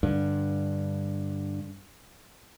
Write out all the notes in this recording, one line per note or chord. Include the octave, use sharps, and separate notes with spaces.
G2 D3